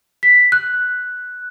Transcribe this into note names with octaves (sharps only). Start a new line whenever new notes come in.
B6
F#6